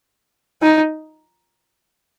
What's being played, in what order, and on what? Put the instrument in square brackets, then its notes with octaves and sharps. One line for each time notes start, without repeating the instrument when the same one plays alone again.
[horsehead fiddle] D#4